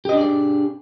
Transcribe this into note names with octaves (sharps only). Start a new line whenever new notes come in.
D4 G4 G#4 D5 D#5